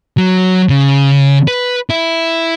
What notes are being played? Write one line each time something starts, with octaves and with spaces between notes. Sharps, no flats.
F#3
C#3
B4
E4